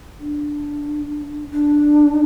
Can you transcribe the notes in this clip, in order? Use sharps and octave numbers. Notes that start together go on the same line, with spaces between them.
D4
D4